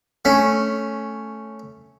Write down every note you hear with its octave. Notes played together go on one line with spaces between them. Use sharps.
A3 C#4